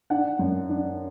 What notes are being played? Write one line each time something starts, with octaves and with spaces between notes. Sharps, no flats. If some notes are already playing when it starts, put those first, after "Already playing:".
D4 F#5
F#2
D4